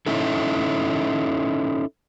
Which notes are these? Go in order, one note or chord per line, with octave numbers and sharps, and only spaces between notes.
C#4 D#4 E4 A4